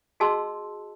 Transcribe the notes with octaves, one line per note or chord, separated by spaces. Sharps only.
F#4 G#4 D#5 A5 C6 E6